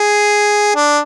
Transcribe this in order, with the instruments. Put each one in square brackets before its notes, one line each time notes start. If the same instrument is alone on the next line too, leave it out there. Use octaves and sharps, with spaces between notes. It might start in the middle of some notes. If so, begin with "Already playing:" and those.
Already playing: [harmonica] G#4
D4